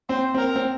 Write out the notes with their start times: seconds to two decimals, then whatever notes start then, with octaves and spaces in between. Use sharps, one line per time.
0.09 C4 C5
0.34 C4 A#4
0.56 C4